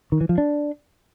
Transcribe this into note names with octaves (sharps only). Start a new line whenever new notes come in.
D#3
E3
F3
D4